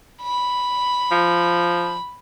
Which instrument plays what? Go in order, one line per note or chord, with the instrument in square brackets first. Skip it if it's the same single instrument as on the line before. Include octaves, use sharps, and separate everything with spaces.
[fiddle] B5
[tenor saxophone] F3